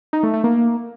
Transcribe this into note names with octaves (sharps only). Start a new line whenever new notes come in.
D#4
A3
A3
A#3